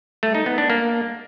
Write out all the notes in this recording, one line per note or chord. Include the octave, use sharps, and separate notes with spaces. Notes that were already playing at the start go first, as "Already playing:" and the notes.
A3
D#4
B3
D4
A#3